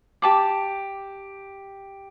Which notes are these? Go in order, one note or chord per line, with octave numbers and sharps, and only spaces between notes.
G4 A5 D6